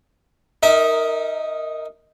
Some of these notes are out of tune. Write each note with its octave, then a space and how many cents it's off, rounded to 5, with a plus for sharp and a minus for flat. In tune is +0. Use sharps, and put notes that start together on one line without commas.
D#4 +0 A#4 -10 E5 -30